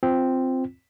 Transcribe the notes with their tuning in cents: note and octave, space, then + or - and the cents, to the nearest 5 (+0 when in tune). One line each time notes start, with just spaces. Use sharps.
C4 -5 F4 +0